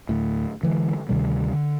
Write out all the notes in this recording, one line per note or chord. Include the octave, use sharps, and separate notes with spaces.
D2 A2
D3 E3 G#3
D2 C3 D#3 G3
D3